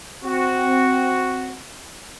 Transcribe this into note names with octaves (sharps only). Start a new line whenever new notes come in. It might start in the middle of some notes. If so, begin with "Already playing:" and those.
C4 F#4